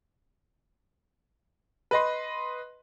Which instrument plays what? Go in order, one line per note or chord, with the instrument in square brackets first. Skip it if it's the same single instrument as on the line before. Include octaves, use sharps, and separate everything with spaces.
[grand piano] B4 D#5 C6